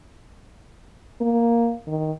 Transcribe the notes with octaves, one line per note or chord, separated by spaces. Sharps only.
A#3
D#3